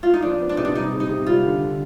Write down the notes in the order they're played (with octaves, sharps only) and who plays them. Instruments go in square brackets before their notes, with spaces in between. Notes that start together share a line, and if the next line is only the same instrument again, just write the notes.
[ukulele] F4
D#4
[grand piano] F3 [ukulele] D4
[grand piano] B3
[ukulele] D4
[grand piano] C3 [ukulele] D#4
[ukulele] D4
[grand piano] G3 [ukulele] D#4
[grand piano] C3
[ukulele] D#4
[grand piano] C3
[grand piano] G3 [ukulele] F4
[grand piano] D3
D3